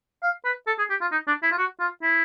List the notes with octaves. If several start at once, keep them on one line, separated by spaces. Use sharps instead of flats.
F5
B4
A4
G#4
G4
F4
D#4
D4
E4
F4
F#4
F4
E4